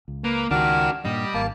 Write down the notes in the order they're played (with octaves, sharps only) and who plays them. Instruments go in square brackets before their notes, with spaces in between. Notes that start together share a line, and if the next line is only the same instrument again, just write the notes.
[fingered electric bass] C#2
[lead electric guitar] A#3 [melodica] B4
[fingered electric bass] C#2 D#3 [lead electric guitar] D4 G4 [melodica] F#4 A#4
[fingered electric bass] G2 A#2 [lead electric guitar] G3 [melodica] D#5
[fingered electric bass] G#1 [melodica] A#3 A5